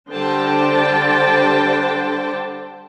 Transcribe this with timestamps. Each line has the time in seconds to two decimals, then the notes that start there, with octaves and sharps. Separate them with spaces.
0.11 D3 G3 D4 C5 G5 A5